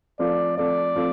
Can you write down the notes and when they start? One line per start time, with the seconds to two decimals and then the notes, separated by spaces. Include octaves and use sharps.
0.19 F3 A3 C4 D5
0.57 F3 A3 C4 D5
0.96 F3 A3 C4